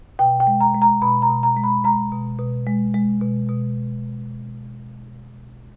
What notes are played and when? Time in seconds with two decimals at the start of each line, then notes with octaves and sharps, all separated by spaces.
0.19 B2 G5
0.40 G5
0.47 G#3
0.61 A#5
0.74 G#3
0.82 A#5
1.02 B2 B5
1.22 A#5
1.29 B2
1.43 A#5
1.56 G#3
1.64 B5
1.84 G#3 A#5
2.12 B2
2.39 B2
2.67 G#3
2.94 G#3
3.21 B2
3.49 B2